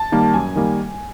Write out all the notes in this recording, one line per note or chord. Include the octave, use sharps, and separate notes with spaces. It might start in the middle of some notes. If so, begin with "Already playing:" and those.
Already playing: A5
D#3 G3 A#3
F#2 G#5
D#3 G3 A#3